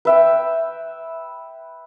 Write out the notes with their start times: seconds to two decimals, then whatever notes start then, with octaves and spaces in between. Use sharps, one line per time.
0.05 B4 E5 G5